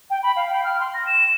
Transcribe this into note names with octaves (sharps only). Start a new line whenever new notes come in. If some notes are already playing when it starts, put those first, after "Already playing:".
G5
B5
F5
G5
F6
C6
A#6
E7